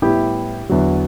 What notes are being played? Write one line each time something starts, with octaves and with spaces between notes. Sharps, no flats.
A2 G3 B3 E4 G4
E2 D3 F#3